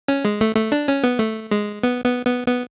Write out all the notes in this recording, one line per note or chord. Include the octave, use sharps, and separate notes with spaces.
C#4
G#3
A3
A3
D4
C#4
B3
A3
G#3
B3
B3
B3
B3